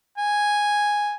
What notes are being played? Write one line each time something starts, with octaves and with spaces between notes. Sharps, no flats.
G#5